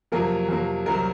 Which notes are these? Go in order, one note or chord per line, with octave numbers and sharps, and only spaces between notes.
F2 C3 F#3 A#3 A#4
F2 C3 F#3 A#3
C2 C3 F#3 C4 A#4